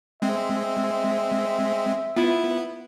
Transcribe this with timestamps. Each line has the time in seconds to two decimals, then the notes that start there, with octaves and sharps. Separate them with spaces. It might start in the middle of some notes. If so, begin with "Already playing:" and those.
0.22 G#3 C4 E5
2.16 B3 E4 F4